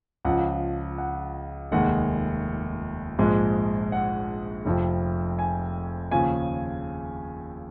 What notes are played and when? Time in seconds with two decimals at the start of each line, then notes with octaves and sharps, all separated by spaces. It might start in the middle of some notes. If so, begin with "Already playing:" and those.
0.25 C#2 C#3 F3 F#5
0.98 F#5
1.72 F1 D#2 D#3 G#3 F#5
3.19 A#1 G#2 F3 G#3
3.92 F#5
4.65 F1 F2 F3
5.39 G#5
6.11 D#2 C#3 F3 G#5